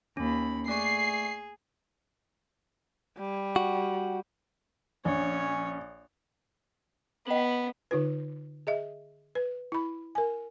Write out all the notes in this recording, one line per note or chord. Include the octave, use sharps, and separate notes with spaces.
D#2 C#4 B5
A3 G#4 D5 C#6 C7
G3
F#4
A#1 C#4 C#5
B3 D#5 F#7
D3 D#4 F4 B4
G#4 D#5 E5
B4
E4 B5
A#4 G#5